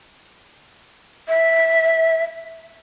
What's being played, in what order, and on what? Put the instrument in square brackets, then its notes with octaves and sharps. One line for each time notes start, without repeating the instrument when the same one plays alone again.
[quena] E5